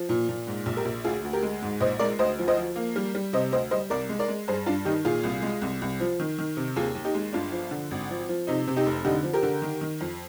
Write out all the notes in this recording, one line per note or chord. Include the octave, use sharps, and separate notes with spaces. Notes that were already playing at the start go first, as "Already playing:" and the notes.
Already playing: F3
A#2
A#2
G#2
A#1
G4 A#4
A#1
D2 F4 G#4
D2
G4 A#4
G#3
G#2
A#1 C5 D#5
G#3 A#4 D5
D2 C5 D#5
F3
C5 D#5
F3
A#3
G3
G3
C3 C5 D#5
D2 C5 D#5
G3 C5 D#5
C2 A#4 D5
G#3
A#4 D5
G#3
G2 G#4 C5
G2 D4 F4
D#3 D#4 G4
A#2 F4 G#4
C2
G#3
C2
C2
F3
D#3
D#3
C3
D#2 F4 G#4
D#2
D#4 G4
G#3
G1 D4 F4
F3
D3
G#1
F3
F3
C3 D#4
C3
D#4 G4
F1
D3 D#4 G4
F3
G4 A#4
D3
D#3
D#3
F2